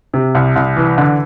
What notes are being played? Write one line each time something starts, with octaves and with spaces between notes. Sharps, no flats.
C3
C2
C2
E3
D3